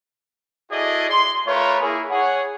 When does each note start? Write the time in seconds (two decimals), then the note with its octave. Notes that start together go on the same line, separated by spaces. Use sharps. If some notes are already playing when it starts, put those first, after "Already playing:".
0.71 E4 F#4 G#4 A4 D5 D#5
1.09 C6
1.47 A3 F4 A#4 B4 C#5
1.81 A#3 E4 G#4
2.10 G#4 C#5 F#5